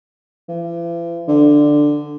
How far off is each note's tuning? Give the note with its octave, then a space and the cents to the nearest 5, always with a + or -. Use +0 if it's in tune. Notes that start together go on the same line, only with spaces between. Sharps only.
E3 +45
D3 +5